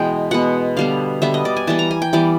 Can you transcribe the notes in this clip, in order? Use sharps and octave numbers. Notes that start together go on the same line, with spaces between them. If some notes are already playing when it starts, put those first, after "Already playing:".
Already playing: B2 E3 G#3 B3 G5
B2 G#3 B3 F#5
D3 G3 B3 F5
D3 G3 B3 E5
D#5
D5
G#5
E3 G3 B3 A5
A#5
G#5
G5
E3 G3 B3 D5